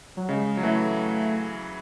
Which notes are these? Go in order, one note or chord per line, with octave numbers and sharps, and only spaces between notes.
F#3
C#3 G#3
F#3
E3 A3